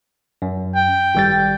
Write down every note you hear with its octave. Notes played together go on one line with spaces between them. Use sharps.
F#2
G5
G#1 G3 A6